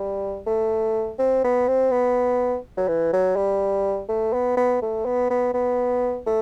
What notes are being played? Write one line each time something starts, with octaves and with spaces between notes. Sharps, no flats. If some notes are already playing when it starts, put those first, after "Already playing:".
Already playing: G3
A3
C4
B3
C4
B3
F#3
E3
F#3
G3
A3
B3
B3
A3
B3
B3
B3
A3